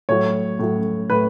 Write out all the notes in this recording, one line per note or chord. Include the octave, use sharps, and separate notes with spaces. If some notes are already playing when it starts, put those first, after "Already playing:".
A2 F#3 C#5
A2 F#3
A2 B4